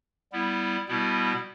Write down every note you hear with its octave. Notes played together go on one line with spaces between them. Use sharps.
G3 B3 E4
B2 G3 B3 E4